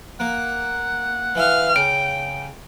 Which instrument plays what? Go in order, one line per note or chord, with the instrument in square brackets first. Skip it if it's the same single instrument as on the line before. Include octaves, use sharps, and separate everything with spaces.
[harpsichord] A#3 [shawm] F#5
[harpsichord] E3 E5 [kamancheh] F5 F6
[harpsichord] C#3 [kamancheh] G5 [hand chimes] D7